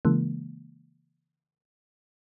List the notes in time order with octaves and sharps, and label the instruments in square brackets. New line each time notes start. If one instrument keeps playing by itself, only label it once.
[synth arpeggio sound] C#3 E3 G#3 A#3